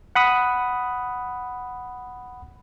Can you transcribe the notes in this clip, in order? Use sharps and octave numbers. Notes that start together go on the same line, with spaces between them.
F#5 B5 D#6